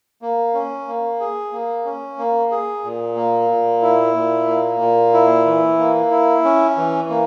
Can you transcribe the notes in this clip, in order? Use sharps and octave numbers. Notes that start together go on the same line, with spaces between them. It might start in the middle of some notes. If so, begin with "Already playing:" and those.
A#3
C#4
A#3
G#4
A#3
C#4
A#3
G#4
A#2
A#3
A#2
E4
A#2
A#3
A#2
E4
E3
A#3
E4
C#4
E3
A#3